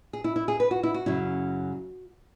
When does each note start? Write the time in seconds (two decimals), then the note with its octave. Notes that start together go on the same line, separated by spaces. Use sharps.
0.13 G#4
0.24 E4
0.36 E4
0.48 G#4
0.60 B4
0.71 F#4
0.83 E4
0.94 F#4
1.06 F#2 C#3 F#3 C#4 E4